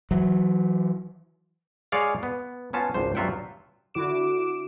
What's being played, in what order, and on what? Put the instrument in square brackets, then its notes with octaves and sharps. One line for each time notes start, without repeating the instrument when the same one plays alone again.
[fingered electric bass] E3 F#3
[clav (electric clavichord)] G#3 G#4 C#5 D5 F5
B3
B3 C#4 F4 A5
G#1 C#2 D4 C5
G2 F#3 F4 E5 F#5 G5
[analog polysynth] D3 E4 F#4 D6 D7 E7